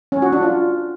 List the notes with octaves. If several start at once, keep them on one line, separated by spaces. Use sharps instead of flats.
C#4
F#4
D4
F4